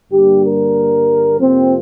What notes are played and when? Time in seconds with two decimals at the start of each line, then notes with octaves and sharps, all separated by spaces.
0.11 G2 D3 G3 A#3 G4
0.43 A#4
1.39 F2 C3 F3 A#3 C4